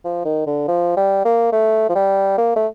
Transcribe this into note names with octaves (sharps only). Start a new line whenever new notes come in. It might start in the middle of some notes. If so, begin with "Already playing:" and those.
F3
D#3
D3
F3
G3
A#3
A3
F3
G3
A#3
A3